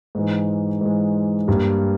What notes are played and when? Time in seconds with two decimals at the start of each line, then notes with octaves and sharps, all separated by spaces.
0.15 G#2 E3 G#3
0.81 G#2 E3 G#3
1.48 G2 G3 A#3